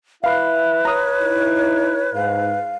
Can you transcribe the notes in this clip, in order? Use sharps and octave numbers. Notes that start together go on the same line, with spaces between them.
E4 B4 E5 F5 B5
C#5 A#5 D#6
D#4 E4
G#2 F5